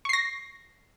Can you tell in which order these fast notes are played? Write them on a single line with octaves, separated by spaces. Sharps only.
C#6 C7 A#6